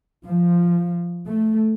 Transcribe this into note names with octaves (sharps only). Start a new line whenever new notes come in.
F3
A3